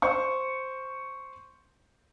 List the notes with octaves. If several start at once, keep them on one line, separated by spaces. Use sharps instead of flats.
C5 C#6